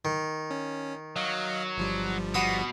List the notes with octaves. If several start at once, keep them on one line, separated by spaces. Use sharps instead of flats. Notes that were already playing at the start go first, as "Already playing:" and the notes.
D#3
C#4
F#3 D#5 F5
G1 F3 G3
B2 F#5 B5 D#6